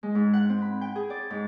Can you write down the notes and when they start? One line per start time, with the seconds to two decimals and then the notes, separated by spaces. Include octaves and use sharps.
0.03 G#3
0.15 G#2
0.33 F#5
0.49 C4
0.62 B5
0.81 G5
0.96 G#4
1.10 D5
1.30 G#2